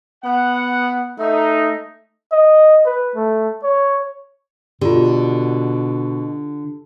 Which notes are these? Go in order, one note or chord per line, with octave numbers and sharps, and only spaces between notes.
B3 F#5
A3 D#4
D#5
B4
A3
C#5
B2 D3 F4 G4